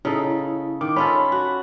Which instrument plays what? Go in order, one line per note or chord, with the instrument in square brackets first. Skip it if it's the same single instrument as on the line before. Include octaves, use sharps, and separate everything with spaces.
[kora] C#3 D#4 A4 [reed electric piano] E4
[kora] D#3 [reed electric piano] D6
[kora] C#4 F4 A4 [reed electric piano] B5
[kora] F#4